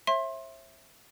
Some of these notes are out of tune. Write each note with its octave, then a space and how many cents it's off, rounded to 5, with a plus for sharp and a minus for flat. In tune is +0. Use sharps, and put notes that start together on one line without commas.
C#5 -45 E5 +0 C6 +25